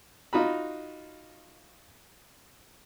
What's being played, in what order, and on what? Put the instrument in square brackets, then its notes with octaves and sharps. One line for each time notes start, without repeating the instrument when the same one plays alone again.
[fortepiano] D#4 F4 F#4 B5